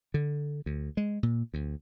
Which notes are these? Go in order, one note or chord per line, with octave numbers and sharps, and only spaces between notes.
D3
D2
G#3
A#2
D2